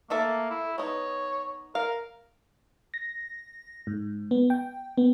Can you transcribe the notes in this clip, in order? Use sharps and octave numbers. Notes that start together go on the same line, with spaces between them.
A3 A#3 A4 E5
E4
B3 D#4 C#5
A#4 F5
A#6
G#2
B3
G5
B3